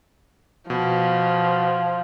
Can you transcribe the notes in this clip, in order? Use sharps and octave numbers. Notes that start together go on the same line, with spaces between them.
B2 F3